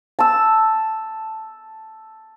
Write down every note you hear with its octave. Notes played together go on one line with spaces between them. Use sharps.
A5 E6